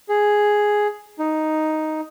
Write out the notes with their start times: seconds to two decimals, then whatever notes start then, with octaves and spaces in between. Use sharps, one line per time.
0.09 G#4
1.19 D#4